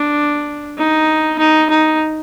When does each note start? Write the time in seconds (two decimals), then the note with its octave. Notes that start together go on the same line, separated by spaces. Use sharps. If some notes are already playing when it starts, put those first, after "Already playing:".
Already playing: D4
0.78 D#4
1.39 D#4
1.70 D#4